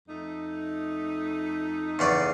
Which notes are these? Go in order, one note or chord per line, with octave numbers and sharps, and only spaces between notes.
F2 A3 D#4
E2 C#3 D5